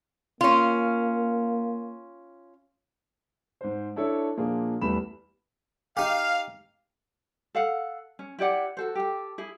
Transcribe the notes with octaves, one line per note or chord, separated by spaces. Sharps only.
A#3 C#4 F4
G#2 C5
D4 E4 A4 C#5
A#2 F3 A#3 D4 G#4
E2 G3 A3 B4 B5 E7
D#4 G4 F5
A4 F5 F#5
C#4
E4 G4 D5 F#5
F#4 A4 C5
G4 A4
E4 G#4